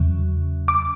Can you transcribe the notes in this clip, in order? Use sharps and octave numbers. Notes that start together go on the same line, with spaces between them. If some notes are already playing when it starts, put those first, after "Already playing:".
Already playing: E2 C#3 F#3
D6